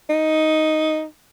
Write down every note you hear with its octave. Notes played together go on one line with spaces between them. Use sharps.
D#4